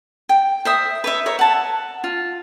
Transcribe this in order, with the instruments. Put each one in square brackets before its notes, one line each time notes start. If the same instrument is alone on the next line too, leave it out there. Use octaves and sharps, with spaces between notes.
[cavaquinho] G5
C5 E5 D#6
B4 C#5 E5
A#4 C#5 E5
F#5 A5
F4